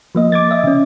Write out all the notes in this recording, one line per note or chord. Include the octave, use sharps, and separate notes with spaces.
F3 A#3 D#5
D6 G#6 A6
D#5 E5
C#3 C#4